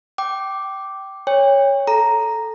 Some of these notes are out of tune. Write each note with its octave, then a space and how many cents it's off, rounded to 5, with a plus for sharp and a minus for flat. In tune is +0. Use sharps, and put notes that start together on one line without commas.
G5 -15 D6 +0
C#5 +0 G5 +35
A4 -10 A#5 +0